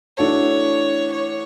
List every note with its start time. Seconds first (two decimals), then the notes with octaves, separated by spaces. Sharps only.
0.17 E3 A3 D4 F#4 A4 C#5
1.12 C#5